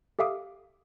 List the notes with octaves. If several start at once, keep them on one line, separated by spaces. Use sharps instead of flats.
G4 A4 E5 F5 D6 D#6